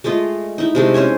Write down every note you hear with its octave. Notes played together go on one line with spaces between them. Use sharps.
G#3 A3 F4 D#5
D#4 E4
C3 G#3 A3
C#4 C5 C#5 G#5